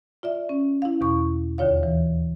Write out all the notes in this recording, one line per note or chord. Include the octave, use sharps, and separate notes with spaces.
F4 D5 E5
C#4
E4 F5
E2 B2 C#6
D#2 D3 F4 C#5 F5
E3